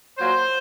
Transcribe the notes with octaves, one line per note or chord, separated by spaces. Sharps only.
A#2 F#3 A#3 C5